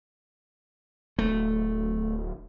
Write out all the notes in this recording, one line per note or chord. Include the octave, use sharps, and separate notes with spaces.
D1 A3